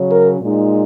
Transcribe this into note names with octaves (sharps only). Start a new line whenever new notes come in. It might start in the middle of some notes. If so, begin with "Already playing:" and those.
Already playing: C#3 F#3 C#4
A#4
A#2 G#3 D#4